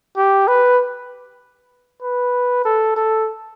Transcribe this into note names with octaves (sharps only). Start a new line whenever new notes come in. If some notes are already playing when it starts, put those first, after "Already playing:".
G4
B4
B4
A4
A4